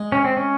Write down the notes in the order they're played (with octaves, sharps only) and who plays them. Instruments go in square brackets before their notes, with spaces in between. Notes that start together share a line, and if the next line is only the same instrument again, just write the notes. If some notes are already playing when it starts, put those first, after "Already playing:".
Already playing: [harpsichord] G#3
[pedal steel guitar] C#4
C4
C#4